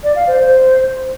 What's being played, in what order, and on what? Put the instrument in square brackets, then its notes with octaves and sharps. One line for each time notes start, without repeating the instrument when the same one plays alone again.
[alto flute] D5
F5
C5
C5